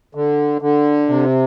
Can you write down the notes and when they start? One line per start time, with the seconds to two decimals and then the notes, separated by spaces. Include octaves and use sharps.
0.15 D3
0.62 D3
1.09 C3